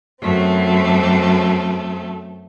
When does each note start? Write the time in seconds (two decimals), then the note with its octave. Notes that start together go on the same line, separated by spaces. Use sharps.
0.22 F#2 A3 C4